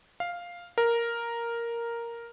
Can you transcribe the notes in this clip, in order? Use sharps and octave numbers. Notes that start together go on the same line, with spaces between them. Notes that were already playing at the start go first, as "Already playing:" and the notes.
F5
A#4